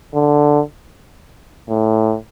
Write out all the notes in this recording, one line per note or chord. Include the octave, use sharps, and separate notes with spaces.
D3
A2